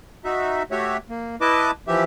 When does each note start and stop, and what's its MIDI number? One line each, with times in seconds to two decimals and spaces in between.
0.24 0.63 63
0.24 0.63 66
0.24 0.63 76
0.71 0.97 57
0.71 0.97 66
0.71 0.97 67
0.71 0.97 73
0.71 0.97 76
1.09 1.36 58
1.41 1.71 64
1.41 1.71 71
1.41 1.71 75
1.41 1.71 81
1.41 1.71 86
1.88 2.04 52
1.88 2.04 53
1.88 2.04 67
1.88 2.04 76